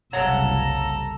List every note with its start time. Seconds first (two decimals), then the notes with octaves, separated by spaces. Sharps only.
0.13 F#1 C2 G#2 A4 C#5 F5 F#5 A#5